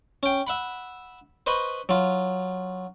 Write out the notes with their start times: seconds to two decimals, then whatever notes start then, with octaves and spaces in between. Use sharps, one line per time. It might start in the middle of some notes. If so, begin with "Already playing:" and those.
0.23 C#4 G5
0.47 E5 F#5 B5
1.47 B4 C5 D#5 B5 C#6
1.89 F#3 F4